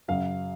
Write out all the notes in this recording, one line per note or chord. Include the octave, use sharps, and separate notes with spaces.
F#2 C#3 F#3 F5